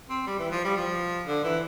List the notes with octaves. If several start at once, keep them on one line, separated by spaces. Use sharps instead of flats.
C4
G3
E3
F3
G3
F3
D3
E3